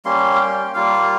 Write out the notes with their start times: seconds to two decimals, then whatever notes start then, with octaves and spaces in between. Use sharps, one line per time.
0.05 G3 A#3 C#4 C6
0.35 F5
0.40 G5
0.74 G3 A#3 F4 F5